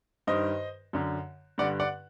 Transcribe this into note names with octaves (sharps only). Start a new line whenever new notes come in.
G2 D#3 C5 D#5
F#2 D3
G2 D3 D5 F#5
D5 F#5